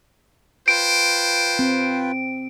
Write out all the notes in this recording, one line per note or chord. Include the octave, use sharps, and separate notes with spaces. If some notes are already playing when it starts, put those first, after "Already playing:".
F4 B4 C5 G5 D7
C4